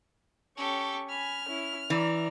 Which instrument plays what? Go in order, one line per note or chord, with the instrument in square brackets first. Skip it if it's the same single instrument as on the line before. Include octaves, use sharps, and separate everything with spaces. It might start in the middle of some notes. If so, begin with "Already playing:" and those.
[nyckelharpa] C#4 C#6 [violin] G4 A4
[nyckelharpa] G#5 B5 [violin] F6
[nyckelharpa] C#4 E4
[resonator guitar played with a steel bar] E3 [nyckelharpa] D5 A#5